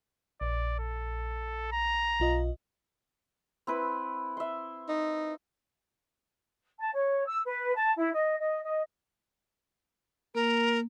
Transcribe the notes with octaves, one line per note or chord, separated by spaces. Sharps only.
A#1 D5
A4
A#5
B1 F4 D#5
C4 E4 B4
E5 C6
D#4
A5
C#5
E6
B4
A5
E4
D#5
D#5
D#5
A#3 A#4